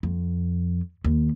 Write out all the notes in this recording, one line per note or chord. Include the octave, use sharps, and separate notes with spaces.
F2
D#2